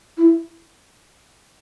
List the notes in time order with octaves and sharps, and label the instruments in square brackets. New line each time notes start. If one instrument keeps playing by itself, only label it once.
[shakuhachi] E4